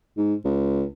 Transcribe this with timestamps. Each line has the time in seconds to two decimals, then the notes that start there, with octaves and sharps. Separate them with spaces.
0.17 G#2
0.45 C#2